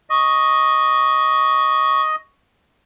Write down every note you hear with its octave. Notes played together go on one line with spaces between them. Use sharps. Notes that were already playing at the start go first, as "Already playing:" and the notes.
D#5 C#6